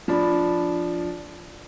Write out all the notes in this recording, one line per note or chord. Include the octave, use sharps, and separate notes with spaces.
F3 D4 B5